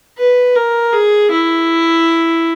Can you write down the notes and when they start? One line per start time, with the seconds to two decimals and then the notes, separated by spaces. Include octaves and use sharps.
0.18 B4
0.56 A#4
0.93 G#4
1.31 E4